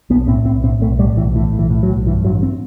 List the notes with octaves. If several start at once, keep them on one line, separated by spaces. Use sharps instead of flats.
B1 B3
A2 C4
B1 C4
A2 C4
B1 A3
A2 G3
B1 E3
A2 E3
B1
E3
A2
F#3
B1
G2 E3
A1 F#3
C4